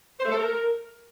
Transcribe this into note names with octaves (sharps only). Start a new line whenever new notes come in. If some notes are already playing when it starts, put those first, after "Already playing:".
C5
A3
A4
A#4